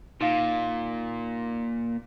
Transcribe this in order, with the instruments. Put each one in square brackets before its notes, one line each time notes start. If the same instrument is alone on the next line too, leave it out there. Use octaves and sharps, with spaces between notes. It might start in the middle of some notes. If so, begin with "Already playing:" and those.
[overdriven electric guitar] A#2 [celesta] D#4 F5